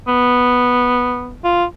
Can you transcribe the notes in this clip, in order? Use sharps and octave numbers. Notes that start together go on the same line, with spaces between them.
B3
F4